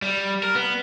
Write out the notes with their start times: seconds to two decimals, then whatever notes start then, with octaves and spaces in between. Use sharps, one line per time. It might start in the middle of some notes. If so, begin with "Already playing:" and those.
0.02 G3
0.43 A#4
0.55 B3